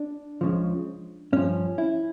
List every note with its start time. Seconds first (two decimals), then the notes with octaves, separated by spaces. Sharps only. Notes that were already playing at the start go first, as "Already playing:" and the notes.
Already playing: D4
0.41 C#2 C#3 F3
1.32 G2 F3 C#4
1.78 E4